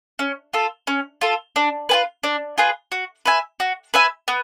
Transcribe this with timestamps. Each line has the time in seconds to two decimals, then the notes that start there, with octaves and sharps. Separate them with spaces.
0.19 C#4
0.53 F4 A4
0.87 C#4
1.21 F4 A4
1.56 D4
1.89 F4 G#4 B4
2.23 D4
2.58 F4 G#4 B4
2.92 F#4
3.25 B4 E5 G#5
3.60 F#4
3.94 B4 E5 G#5
4.28 B3